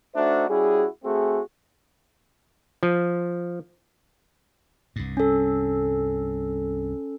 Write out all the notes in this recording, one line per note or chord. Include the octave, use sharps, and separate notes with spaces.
A3 D4 D#4 F#4 C5 E5
G3 C#4 E4 F#4 G#4
A3 C4 F#4 G#4
F3
C2 G2
C#4 A4